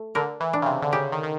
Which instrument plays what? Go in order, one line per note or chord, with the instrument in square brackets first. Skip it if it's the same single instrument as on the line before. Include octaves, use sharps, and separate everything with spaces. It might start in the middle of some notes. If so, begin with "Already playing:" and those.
Already playing: [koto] A3
[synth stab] D3 [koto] A#4
[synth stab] E3
[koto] D4
[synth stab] C#3
C3
D3
[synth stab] C#3 [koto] G4
[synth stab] D#3
D#3